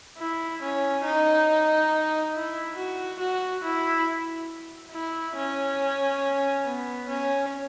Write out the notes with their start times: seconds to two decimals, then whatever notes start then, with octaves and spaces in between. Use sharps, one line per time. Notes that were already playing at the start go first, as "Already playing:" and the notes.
0.19 E4
0.62 C#4
1.05 D#4
2.34 E4
2.77 F#4
3.20 F#4
3.64 E4
4.92 E4
5.36 C#4
6.64 B3
7.09 C#4